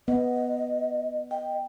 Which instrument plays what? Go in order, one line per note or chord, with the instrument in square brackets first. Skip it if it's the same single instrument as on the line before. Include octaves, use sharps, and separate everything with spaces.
[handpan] B3 [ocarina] D#5
[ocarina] D#5 [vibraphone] G5